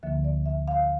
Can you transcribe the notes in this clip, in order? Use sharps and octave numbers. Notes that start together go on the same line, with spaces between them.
D2 D3 F3 A#3 E5
D5
E5
F5